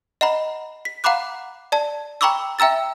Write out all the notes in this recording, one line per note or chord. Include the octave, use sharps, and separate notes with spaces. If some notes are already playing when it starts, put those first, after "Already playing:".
D#5 F#5 A#5 B5
B6
F5 F#5 A#5 B5 D6 F#6
D5 A5
G5 A#5 B5 C#6 D6 E6
E5 G5 A#5 E6 A6